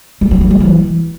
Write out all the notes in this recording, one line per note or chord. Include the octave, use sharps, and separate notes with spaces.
G3
F#3
E3
G3
E3